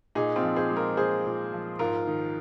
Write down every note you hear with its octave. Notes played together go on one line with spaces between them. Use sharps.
A#2 D#4 G#4
C4 F4
F3
G#4 C5
G#3
F4 A#4
A#2 G#4 C5
A#2
F3
G#2 F4 A#4
D#3